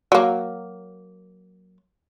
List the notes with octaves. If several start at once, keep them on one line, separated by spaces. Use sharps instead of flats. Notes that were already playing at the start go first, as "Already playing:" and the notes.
F#3 A#3